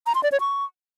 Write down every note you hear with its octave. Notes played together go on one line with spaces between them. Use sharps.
A#5
C6
D5
C#5
C#6